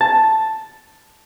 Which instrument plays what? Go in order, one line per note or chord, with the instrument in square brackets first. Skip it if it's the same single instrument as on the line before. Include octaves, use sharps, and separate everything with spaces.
[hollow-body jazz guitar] A5